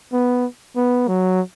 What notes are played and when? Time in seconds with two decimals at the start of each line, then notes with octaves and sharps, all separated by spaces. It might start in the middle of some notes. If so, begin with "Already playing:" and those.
0.12 B3
0.76 B3
1.08 F#3